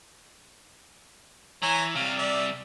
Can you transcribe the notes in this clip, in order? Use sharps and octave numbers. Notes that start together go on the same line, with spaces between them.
E3 C#5 G#5 A#5
C3 G3 F5
D5 E5